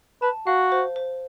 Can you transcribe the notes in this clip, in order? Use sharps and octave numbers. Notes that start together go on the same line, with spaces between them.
B4 A5
F#4 F5
C5
C5